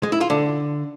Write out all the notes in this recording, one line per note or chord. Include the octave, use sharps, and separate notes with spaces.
G#3
E4
F4
D3